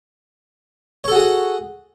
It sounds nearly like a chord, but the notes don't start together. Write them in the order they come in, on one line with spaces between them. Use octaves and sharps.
C#5 A4 F#4 G#4 F#5